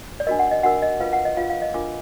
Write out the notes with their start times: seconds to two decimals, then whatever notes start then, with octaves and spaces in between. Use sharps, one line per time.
0.20 D5
0.27 D4 F#4 A#4 D#5
0.39 F#5
0.51 D#5
0.63 D4 F#4 A#4 F#5
0.82 D#5
1.00 F4 B4 F5
1.13 F#5
1.25 D#5
1.37 F4 B4 F5
1.50 F5
1.62 D#5
1.74 D4 F4 A#4 D6